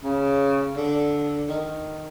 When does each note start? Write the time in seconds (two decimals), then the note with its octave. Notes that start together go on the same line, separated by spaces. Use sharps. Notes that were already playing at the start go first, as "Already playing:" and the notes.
0.04 C#3
0.77 D3
1.49 D#3